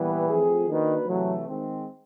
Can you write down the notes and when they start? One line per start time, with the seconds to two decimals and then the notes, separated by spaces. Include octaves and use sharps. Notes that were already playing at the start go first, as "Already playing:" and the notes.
Already playing: A#2 E3 G3 B3
0.28 F3 A3 C4 F4 G#4
0.68 D#3 A#3 D4 F#4 B4
1.07 C3 E3 F#3 A3
1.46 D#3 G#3 C4